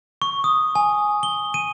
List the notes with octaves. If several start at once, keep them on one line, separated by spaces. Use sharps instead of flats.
C#6
D#6
G#5
G7
D#7